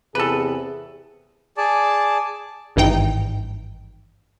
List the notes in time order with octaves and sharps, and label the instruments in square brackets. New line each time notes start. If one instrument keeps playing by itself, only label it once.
[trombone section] E2 C3 G#4 [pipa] A4 B4
[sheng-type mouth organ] G#4 D5 A5
[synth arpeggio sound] G#1 G2 E3 D#4 G5